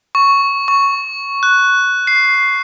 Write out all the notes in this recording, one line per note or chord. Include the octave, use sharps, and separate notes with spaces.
C#6
C#6
F#6
C7